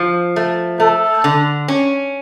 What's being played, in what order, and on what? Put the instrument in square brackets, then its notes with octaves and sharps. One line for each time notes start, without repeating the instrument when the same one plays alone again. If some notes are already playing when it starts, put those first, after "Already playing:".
Already playing: [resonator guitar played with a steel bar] F3
A3
[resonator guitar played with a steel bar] A3 [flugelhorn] A4
[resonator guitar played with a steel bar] D3
C#4